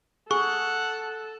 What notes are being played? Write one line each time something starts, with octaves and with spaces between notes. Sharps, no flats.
G#4 A4 F#5 C#6